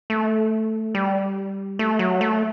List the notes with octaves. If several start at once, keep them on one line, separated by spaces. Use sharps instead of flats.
A3
G3
A3
F#3
A3